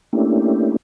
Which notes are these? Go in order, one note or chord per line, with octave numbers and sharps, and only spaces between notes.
A3 A#3 C#4 D4 E4 G4